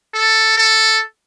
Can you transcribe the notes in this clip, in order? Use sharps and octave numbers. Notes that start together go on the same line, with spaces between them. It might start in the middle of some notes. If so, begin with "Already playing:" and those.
A4
A4